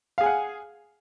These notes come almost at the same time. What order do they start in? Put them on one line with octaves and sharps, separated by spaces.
F5 G#4 G#5 F#5